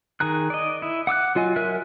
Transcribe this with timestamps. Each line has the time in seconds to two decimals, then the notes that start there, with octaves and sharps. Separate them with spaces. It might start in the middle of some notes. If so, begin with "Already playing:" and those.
0.20 D#3 G#4 A#5 F#6
0.50 D5 D#5
0.82 E4
1.07 F#5 D6 E6 F#6
1.35 F#3 F4 D#5 G#5
1.56 F#3 A#4 E5 G#5 F#6